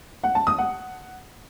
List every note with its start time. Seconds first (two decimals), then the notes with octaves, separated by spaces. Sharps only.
0.24 F#5
0.35 A5
0.47 D#6
0.58 F#5